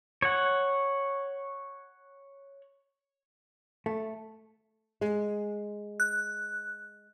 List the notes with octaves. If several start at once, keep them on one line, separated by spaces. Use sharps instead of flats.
C#5 F#5
A3
G#3
F#6